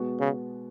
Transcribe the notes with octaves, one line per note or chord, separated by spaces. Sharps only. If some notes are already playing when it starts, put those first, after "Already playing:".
Already playing: B2 G#3 B3 F#4
C#3